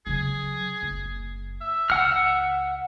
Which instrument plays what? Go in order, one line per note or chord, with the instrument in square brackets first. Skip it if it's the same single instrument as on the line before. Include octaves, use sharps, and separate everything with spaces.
[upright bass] C#3 F#3 [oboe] G#4
[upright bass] F#1
[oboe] E5
[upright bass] C#2 [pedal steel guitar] F#5 F6